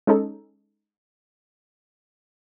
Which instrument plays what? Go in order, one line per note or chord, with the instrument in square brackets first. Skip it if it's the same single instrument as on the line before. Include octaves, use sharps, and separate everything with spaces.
[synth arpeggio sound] G#3 C#4 D#4 A4